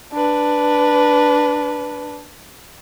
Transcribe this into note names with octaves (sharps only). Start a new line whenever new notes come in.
D4 B4